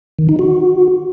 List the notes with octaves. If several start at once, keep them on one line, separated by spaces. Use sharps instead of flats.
D#3
D#4
F#4